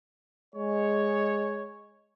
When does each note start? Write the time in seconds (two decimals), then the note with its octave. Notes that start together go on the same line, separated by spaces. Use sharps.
0.55 G#3 C#5